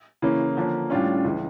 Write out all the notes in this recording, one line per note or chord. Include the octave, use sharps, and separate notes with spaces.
C#3 E3 A#3 C#4 E4
D3 F3 A#3 C#4 D4
A2 G3 C#4 D4 F4 C#5
C#2 C#3 E3